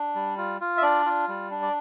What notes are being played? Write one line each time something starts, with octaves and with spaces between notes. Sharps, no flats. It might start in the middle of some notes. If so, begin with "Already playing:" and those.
Already playing: D4
G3
F4
F4
E5
D4 D5
F4
G3
D4
D5